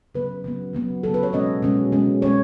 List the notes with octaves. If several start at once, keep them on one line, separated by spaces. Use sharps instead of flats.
C#3 F#3 B3 B4
C#3 F#3 B3
C#3 F#3 B3
C#3 F#3 B3 A4
B4
C#5
B2 G#3 C#4 D#5
B2 G#3 C#4
B2 G#3 C#4
B2 G#3 C#4 C#5